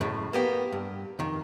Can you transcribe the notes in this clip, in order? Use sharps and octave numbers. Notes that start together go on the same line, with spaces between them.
C#2 F#2 A2 C#3
A#3 B3 G4
G2
F2 D#3